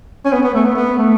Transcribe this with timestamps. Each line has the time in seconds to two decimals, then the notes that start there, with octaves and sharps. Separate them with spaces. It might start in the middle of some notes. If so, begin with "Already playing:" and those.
0.25 C#4
0.33 B3
0.43 B3
0.54 A3
0.65 B3
0.75 B3
0.98 A3